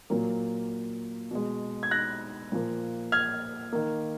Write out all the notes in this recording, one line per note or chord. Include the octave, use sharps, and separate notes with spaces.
A#2 F#3 A#3
B2 G#3
G#6
F#6 A#6
A#2 F3 A#3
F6 G#6
D#3 A#3